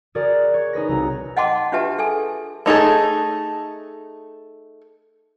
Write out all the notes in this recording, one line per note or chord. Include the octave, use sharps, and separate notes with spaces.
F#4 G#4 A#4 C#5 D5
C#5 G#6
D#4 G#4 B4 A#6
C2 F#4 A#5
D#5 F#5 G5 A5 C6 D6
D4 F4 G4 B4 E5 A5
G#4 A4 G#5
A3 D#4 G#4 A4